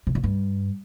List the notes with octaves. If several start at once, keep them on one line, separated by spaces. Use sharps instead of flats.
C3
C#3
G2